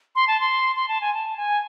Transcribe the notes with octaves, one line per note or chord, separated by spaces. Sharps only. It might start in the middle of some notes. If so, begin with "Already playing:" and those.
C6
A5
C6
C6
A5
G#5
A5
G#5